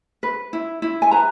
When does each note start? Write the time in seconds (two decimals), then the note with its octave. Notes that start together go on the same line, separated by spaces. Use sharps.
0.23 B4
0.53 E4
0.82 E4
1.02 G#5
1.11 B4 A#5